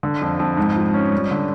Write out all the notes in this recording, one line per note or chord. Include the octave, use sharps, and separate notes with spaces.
D3
F2
F2
G#2
F3
C#4
G3
D3